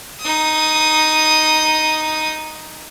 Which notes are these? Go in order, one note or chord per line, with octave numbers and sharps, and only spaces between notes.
D#4 D#6